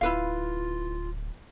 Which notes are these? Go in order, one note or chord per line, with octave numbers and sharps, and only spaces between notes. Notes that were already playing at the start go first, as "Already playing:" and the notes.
D1 E4 F4 B4 F5